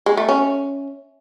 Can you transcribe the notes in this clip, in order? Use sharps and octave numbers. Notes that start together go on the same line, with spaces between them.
G#3
A3
C#4